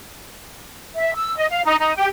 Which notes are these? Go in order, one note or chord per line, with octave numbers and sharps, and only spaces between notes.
E5
E6
D#5
F5
D#4
D#4
G4